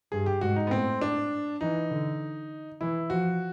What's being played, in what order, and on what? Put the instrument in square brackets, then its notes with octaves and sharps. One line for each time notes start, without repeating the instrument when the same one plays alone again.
[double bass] G2 [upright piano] G#4
[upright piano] G4
[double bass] G#2 [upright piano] F#4
[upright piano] D#4
B3
[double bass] A2 [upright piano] C4
[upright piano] D4
[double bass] E3 [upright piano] D#4
[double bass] D3
[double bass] E3 [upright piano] E4
[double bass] F3 [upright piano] F#4